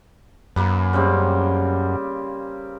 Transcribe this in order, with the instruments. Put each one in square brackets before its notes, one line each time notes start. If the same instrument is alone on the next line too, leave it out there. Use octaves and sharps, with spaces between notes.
[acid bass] F#2 [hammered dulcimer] A#3 B4
[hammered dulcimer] C#3 G3 C4